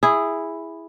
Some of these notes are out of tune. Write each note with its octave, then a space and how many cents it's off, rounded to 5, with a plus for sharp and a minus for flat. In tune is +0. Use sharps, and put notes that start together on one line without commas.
E4 +0 G#4 -10